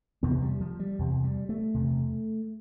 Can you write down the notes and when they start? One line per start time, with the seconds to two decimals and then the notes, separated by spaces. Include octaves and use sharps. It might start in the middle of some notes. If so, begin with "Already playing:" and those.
0.23 E2 C3 B3
0.42 G3
0.61 F3
0.79 G3
0.99 E2 C3
1.24 G3
1.49 A3
1.74 E2 C3